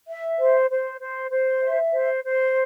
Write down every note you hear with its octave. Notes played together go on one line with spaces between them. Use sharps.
E5
C5
C5
C5
C5
E5
C5
C5